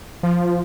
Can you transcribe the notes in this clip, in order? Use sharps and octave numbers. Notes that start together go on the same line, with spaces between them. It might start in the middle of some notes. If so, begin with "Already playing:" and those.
F3